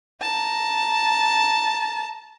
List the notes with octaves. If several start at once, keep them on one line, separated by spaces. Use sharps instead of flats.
A5 A#5